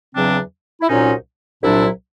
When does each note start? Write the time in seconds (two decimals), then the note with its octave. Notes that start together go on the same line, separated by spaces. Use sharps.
0.14 E2 C#3 F#3 C4 D4
0.81 E4
0.88 C2 A#2 F#3 C#4 D#4
1.62 C2 A#2 F#3 D4 E4